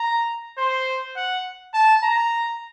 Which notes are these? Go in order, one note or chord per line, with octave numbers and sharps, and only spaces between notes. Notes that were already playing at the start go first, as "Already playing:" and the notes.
Already playing: A#5
C5
F#5
A5
A#5